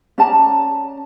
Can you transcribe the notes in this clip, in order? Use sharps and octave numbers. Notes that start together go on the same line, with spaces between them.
C#4 D5 A5 A#5